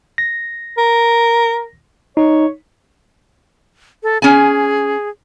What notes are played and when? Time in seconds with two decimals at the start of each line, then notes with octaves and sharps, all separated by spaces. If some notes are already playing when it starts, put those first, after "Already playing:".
0.18 A#6
0.78 A#4
2.17 D#4 C#5
4.03 A4
4.22 C#4 G#4 G#5